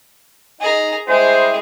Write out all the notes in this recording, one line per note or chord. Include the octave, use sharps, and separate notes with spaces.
D#4 G#4 A#5
G3 G#3 E4 G#4 C5